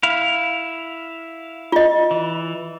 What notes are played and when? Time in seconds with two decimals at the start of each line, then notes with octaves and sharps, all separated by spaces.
0.03 E4 F5
1.72 F4 D#5
2.11 E3